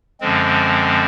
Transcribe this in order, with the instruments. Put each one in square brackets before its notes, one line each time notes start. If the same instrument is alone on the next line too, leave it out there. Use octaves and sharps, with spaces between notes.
[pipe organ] F#2 D3 F3 G#3 C4